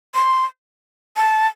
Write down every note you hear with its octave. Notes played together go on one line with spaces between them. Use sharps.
C6
A5